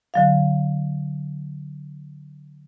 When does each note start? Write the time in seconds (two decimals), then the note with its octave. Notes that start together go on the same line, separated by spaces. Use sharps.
0.14 D3 F#3 F5